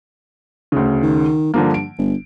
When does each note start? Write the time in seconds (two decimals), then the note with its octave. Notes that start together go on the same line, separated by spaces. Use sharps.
0.72 D2 C#3
1.02 D#3
1.54 G2 D3 F3 A#3
1.74 D7
1.98 G1